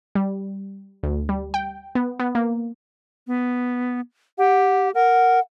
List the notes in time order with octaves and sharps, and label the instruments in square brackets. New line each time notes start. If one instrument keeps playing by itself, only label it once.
[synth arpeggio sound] G3
D2
G3
G5
B3
B3
A#3
[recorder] B3
[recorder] G4 [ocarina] F#5
[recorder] A#4 [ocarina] F#5